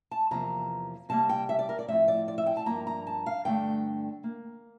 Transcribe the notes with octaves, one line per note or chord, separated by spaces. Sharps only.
A5
E2 C3 F3 A#3 A#5
C3 G3 A#3 A5
G5
E5
D5
A#4
D5
A2 F3 C4 E5
D5
D5
E5
G5
A5
G2 F3 A#3 A#5
A#5
A5
F5
G2 D3 A3 G5
A#3